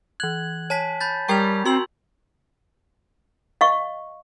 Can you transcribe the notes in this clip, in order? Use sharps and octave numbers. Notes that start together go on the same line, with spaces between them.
E3 F#6 G#6 F#7
C#5 G#5 A5 B6
B5 G6 A6
G3 A#4 G5 A#5 C#6 G#6 F7
C4 F#4 C6 E6 F#7
D#5 F5 C#6